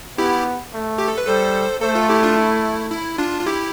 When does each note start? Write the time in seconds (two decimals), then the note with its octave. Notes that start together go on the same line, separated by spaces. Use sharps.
0.18 B3 E4 G4
0.73 A3
0.98 G4
1.08 A4
1.18 B4
1.27 G3 A4 C5
1.82 A3 A4 C5
1.95 F4 A4
2.09 E4 G4
2.23 D4 F4
2.37 E4
2.91 E4
3.18 D4 F4
3.41 F4
3.46 E4 G4